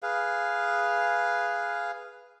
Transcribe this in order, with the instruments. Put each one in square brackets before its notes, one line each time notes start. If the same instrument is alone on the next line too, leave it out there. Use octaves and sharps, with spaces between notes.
[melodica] G#4 B4 F5